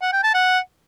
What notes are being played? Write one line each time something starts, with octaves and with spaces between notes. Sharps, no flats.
F#5
G5
A5
F#5